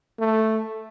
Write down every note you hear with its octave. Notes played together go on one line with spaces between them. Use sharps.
A3